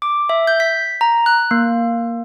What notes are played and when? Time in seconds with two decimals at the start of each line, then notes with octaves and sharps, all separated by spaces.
0.02 D6
0.29 E5
0.47 G6
0.60 B6
1.01 A#5
1.26 F#6
1.51 A#3